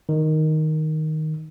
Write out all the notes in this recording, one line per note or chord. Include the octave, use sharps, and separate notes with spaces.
D#3